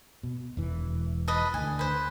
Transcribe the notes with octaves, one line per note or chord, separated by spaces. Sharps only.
B2
E1 E3
B4 D#5 A5
D2 D3 G#5
B4 C5